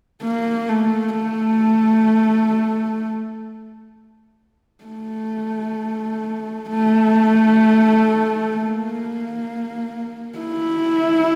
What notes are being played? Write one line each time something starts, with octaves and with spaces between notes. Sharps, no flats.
A#3
A3
A3
A3
A3
A#3
E4